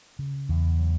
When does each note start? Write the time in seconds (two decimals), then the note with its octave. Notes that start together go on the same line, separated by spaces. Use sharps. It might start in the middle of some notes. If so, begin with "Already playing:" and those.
0.19 C#3
0.49 E2
0.79 F#3